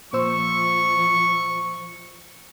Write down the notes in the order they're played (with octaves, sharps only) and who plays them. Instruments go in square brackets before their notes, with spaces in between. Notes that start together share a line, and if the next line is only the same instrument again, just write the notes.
[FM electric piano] A#2 C5 E6 [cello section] F3 [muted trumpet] C#6